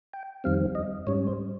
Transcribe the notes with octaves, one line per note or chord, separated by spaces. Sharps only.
G5
F2 D#3 G3 C4 F5
D#5
G#2 G3 C#4 C#5
C5